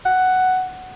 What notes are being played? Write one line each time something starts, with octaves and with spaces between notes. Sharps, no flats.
F#5